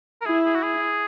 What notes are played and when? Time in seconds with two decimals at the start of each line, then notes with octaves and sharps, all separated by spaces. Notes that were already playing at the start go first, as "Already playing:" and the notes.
0.21 A#4
0.26 E4 G#4
0.45 G#4
0.55 F#4
0.63 G#4